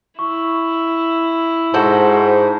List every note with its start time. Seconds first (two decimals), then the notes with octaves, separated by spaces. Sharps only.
0.19 E4 C#6
1.74 G#2 F#4 A4 C5 A5 B5 G6